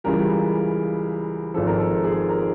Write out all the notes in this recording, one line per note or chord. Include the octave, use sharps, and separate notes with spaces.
C#2 C#3 E3 G3 A#4
G#1 G#2 F3 A4
A#4
A4
G#4
A#4